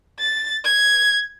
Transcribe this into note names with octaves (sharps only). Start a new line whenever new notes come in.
A6
G#6